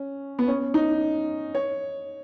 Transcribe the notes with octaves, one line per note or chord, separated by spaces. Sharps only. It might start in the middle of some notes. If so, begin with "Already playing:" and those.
Already playing: C#4
B3
C#4
D#4
C#5